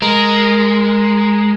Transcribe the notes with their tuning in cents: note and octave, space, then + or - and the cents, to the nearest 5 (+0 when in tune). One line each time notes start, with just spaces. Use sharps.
G#3 +0 A#4 +0